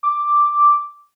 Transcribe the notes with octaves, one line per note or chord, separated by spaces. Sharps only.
D6